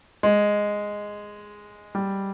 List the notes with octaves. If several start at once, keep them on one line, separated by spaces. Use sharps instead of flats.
G#3
G3